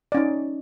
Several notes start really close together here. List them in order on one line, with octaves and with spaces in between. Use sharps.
D5 C#4 D#4